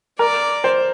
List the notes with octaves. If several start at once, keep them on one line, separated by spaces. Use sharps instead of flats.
A#4 D5
C5